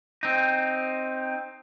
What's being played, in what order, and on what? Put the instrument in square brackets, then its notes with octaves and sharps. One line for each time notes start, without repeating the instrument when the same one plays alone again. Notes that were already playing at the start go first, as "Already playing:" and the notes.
[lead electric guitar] C4 D#4